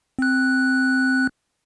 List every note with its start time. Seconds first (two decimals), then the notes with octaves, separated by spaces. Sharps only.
0.19 C4 F#6